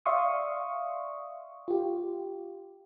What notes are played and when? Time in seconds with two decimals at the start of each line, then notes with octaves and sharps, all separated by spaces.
0.06 D5 E5 F5 C6 C#6 D#6
1.68 F4 G4